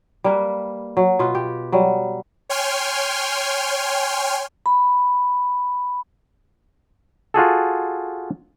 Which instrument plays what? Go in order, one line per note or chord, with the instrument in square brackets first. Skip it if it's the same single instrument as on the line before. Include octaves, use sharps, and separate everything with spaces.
[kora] G3 A#3 B4
F#3
B2 F4 B4
G4
F#3 G3
[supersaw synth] C#5 G5 G#5 C6 F6
[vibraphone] B5
[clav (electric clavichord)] F4 F#4 G#4 A4